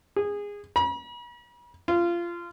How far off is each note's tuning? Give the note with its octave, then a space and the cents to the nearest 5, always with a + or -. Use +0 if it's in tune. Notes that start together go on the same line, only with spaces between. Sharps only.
G#4 -20
B5 -45
F4 -20